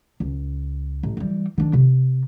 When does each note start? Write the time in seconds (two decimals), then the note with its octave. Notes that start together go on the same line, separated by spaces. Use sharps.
0.20 C#2
1.03 A1
1.17 E3 G3
1.58 D#3 D4
1.73 C3